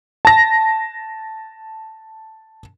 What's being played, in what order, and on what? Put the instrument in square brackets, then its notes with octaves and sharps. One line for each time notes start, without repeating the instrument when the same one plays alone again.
[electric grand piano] A5 A#6